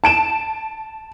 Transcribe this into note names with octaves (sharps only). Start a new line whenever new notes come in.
A5 D7 E7